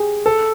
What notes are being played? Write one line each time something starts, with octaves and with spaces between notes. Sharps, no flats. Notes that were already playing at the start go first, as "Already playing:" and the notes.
Already playing: G4 G#4
A4